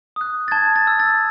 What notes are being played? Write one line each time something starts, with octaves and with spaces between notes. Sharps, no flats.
D#6 F#6
A6
A5 G#6
A6
E6
A6